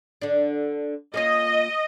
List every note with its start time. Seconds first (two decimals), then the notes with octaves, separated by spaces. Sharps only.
0.22 D3 D4
1.14 A#3 C#4 F4 D#5